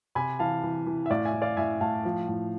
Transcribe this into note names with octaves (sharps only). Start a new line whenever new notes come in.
C3 G#5 B5
E3 F5 A5
E3
E3
E5
A2 D5 F5
E5 G#5
A2
D5 F5
A2 E5 G#5
A2 F5 A5
F3
A2